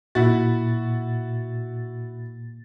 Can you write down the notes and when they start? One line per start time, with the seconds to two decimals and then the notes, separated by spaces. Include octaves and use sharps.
0.15 A#2 E4 F#4 A6